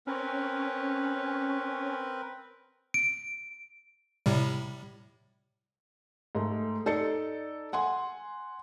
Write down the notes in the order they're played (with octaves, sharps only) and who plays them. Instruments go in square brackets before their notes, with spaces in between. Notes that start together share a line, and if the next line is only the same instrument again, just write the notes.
[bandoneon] C4 A#4 B4 [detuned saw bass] C#4
[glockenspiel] D7
[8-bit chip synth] A2 C3 G3
[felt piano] G#2 A3
D#4 A4 D5 A6 C#7
F#5 G#5 C6